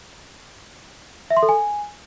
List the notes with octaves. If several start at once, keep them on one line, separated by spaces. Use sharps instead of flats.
E5
C6
A4
G#5